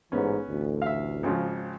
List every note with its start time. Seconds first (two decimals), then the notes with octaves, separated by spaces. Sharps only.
0.12 A1 G#2 E3 B3 C#4
0.49 A1 D2
0.82 E5 F5
1.23 G#1 C#3 F3